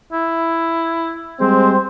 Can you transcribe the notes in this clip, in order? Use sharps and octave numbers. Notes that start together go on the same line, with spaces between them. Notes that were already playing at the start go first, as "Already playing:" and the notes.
E4
G3 G#3 C4 C5